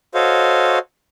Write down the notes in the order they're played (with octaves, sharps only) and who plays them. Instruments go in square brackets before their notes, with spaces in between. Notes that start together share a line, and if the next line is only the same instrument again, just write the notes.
[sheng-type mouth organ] F#4 A4 C5 C#5 D#5 F5